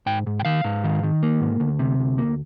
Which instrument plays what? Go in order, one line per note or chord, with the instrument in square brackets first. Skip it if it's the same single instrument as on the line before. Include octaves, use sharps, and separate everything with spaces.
[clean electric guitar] G#2 G5
G#2
G5
D#3 F5
G#2
D#3
D#3
A#3
G#2
D2
C3
D2
A#3